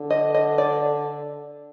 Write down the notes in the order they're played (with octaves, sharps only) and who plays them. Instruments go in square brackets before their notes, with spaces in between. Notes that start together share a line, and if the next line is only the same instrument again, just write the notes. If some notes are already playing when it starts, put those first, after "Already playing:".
Already playing: [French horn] D3
[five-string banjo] D#5
D#5
D5